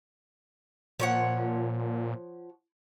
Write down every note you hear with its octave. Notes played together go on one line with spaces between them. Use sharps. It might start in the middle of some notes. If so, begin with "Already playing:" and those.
A#2 F3 C#5 F#5